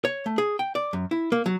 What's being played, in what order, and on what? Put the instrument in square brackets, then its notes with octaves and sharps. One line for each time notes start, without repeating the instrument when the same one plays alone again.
[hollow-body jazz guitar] C#5
A3
G#4
G5
D5
F#2
E4
A#3
F#3